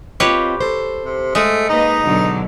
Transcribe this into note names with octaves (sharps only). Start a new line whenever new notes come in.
C4 F4 G4 B4 C#5 D#5
A4 C5
C3
G#3 A3
A#3 D#4 B4 D#5
B2 D3 F#3